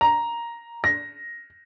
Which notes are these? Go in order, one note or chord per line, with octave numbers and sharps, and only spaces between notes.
A#5
A#6